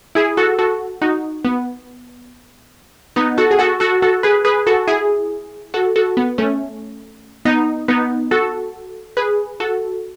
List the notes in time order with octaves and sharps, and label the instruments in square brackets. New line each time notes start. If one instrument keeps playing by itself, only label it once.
[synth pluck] E4 G#4
F#4 A4
F#4 A4
D#4 F#4
B3
B3 D#4
F#4 A4
G#4
F#4 A4
F#4 A4
F#4 A4
G#4 B4
G#4 B4
F#4 A4
E4 G#4
F#4 A4
F#4 A4
B3
A3 C#4
B3 D#4
B3 D#4
F#4 A4
G#4 B4
F#4 A4